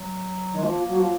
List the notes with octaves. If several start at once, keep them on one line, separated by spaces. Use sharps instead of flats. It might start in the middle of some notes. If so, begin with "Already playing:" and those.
Already playing: F#3
D#3
G#3
F3 A#3
F#3
F3